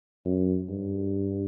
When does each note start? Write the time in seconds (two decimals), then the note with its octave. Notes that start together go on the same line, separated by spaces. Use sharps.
0.25 F#2
0.69 G2